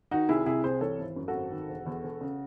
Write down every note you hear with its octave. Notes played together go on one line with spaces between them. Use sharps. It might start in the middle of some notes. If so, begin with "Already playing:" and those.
D#3 D#4 F#4
C2 E4 G#4
C3 E4 G#4
C2 G#4 C5
E3 A4 C#5
G#1
F#2
F#4 A4
G#1
D#3
E1
E2
E1
C#3